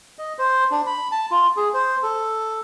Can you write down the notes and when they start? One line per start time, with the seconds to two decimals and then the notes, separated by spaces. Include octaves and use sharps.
0.19 D#5
0.39 C5
0.71 D4
0.86 B5
1.11 A5
1.31 F4
1.57 G#4
1.74 C5
2.03 A4